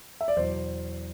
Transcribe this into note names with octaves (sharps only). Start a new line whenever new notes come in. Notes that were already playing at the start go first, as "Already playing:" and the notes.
E5
D5
E2 B2 F#3 C5